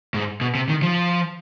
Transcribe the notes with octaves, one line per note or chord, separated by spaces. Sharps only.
G#2
B2
C3
D#3
F3